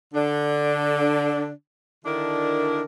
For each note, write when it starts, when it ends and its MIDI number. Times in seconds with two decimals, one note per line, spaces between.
0.14 1.50 50
0.14 1.50 62
2.05 2.82 50
2.05 2.82 51
2.05 2.82 62
2.05 2.82 64
2.05 2.82 70